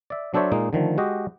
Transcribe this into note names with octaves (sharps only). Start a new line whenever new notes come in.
D5 E5
F#3 D4 A4 C5 C#5 E5
A#2 G#3 A#3 D#4
D3 D#3 F3 A3
G#3 F#4 G4 D#5